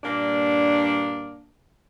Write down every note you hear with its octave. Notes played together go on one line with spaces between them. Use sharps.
G2 A#2 A#3 D4